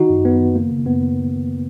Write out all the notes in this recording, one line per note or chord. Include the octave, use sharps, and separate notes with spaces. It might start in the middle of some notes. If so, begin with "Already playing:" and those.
Already playing: D#3 D#4 F#4
F#2
F#2 B3
D#3
C#3 A#3
C#3
F#2 B3